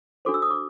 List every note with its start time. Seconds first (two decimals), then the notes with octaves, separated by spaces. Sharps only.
0.25 D4 F#4 A4 C5 D6
0.34 E6
0.42 D#6
0.51 D6